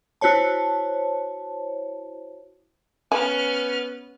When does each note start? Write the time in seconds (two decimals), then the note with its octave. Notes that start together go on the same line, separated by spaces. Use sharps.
0.21 E4 F#4 C5 C#5 A5
3.12 B3 C#4 G#5 F6